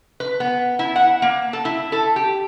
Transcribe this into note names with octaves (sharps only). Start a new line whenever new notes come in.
B4
B3
E4
F#5
A#3
A4
E4
A4
G4